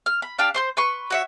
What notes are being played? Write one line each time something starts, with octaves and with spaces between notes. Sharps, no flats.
F6
B5
D4 G4 F5 A5
C5 C6 G6
B4 C6 C#6
F#4 C#5 E5